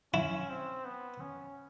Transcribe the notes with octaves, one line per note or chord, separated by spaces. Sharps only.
C#4 E4
C4
B3
C#4